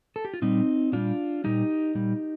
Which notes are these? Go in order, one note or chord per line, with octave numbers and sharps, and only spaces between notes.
A4
G4
F4
A#2 G3 C4 D#4
A#2 G3 D4 F4
A#2 G3 D#4 G4
A#2 G3